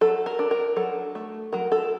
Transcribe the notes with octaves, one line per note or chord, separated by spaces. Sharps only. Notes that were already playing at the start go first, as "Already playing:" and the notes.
F#3 A4
A#4
D4
A#4
F#3 A4
A3
F#3 A#4
A4